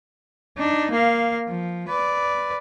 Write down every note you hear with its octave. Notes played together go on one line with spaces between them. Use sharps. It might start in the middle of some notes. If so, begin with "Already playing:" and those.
D4 D#4
A#3 F5
F3
B4 D5